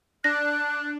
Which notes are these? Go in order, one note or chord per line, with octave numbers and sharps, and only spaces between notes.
D4 F#6 A#6